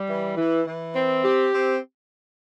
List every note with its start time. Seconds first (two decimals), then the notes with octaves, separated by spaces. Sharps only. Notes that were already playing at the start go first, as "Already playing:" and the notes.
Already playing: G3
0.09 E3
0.37 E3
0.66 E3
0.95 C4
1.24 G4
1.53 C4